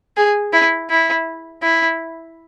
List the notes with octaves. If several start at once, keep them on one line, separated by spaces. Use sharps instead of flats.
G#4
E4
E4
E4